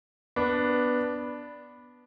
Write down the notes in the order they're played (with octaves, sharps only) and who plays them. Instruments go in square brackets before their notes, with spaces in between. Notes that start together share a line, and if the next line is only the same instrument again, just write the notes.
[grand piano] B3 D4